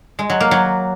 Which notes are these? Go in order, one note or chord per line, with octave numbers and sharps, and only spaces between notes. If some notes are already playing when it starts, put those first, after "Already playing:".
G#3
F#3
A#3
F#3